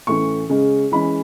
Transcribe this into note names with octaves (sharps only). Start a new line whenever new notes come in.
A2 E3 A3 C#4 C#6
C#3 G#3 C#4
E3 G#3 C#4 B5